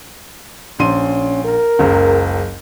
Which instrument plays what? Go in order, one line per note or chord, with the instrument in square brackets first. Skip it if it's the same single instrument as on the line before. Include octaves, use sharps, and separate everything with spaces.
[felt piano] A#1 C6 D#7 [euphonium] C#4
[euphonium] A#4
[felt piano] F#1 C#2